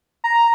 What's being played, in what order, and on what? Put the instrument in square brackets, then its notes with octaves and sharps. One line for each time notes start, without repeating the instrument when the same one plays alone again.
[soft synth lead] A#5